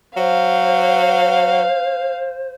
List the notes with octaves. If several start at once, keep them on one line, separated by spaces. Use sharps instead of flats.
F#3 C5 F5